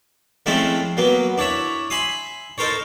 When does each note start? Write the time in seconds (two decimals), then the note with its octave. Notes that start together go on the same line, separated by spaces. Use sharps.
0.46 F3 G#3 A3 C4 C#4 E4
0.97 F#3 A#3 B3
1.38 D4 E4 C#5 E5
1.90 E5 G#5 B5 C6 D#6
2.58 D#4 A4 A#4 C5 C#5